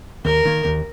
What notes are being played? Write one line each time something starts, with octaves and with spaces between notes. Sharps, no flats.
D#2 A#4
D#3 A#3
D#2